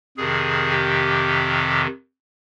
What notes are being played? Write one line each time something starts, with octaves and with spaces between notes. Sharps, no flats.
F2 C3 D#3 G#4
G4